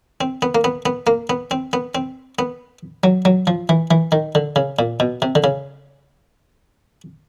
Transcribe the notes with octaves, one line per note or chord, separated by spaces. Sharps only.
C4
B3
A#3
B3
B3
A#3
B3
C4
B3
C4
B3
F#3
F#3
F3
E3
E3
D#3
D3
C#3
A#2
B2
C3
D3
C#3